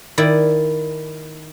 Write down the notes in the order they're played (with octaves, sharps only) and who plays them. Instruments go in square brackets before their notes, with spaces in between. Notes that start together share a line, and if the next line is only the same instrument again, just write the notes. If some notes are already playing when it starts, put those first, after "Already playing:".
[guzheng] D#3 E4 D5